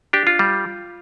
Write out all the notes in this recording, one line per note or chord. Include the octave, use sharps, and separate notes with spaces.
D4 G4
F4
G3